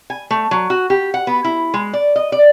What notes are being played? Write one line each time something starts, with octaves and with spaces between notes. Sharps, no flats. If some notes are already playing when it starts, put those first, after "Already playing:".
G#5
A3
F#3
F#4
G4
F#5
B3
E4
G#3
D5
D#5
D5